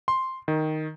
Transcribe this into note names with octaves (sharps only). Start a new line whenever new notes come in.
C6
D#3